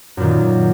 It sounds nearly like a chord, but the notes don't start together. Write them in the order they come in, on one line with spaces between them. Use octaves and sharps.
F#2 A#2 D#3